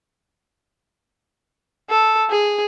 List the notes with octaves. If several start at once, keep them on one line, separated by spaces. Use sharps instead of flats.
A4
G#4